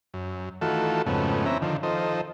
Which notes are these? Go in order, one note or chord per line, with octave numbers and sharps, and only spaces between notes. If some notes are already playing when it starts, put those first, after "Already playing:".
F#2
D#3 E3 A3 F4 F#4 A4
F2 G#2 C#3 A3 B3
E3 C4 C#4 E5 A#5
D3 D#3 F3
D#3 F3 A4 C5 D#5